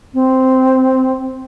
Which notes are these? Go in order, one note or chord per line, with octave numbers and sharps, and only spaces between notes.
C4